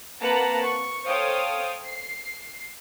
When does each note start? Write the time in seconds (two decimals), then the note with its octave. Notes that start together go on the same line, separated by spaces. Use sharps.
0.21 A#3 C4 B4 F#5 A5 A#5
0.64 C#6
1.08 A4 C5 C#5 F5 G5 D#6
1.87 C7